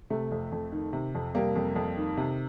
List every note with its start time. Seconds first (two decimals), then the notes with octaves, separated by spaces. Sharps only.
0.10 C3 A3
0.31 F2
0.52 F2
0.72 D#3
0.93 C3
1.15 F2
1.35 C3 G3 A#3
1.55 F2
1.76 F2
1.97 D#3
2.17 C3